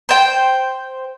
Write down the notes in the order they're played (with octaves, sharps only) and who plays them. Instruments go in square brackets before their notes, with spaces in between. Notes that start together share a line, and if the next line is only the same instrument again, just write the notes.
[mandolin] C5 G5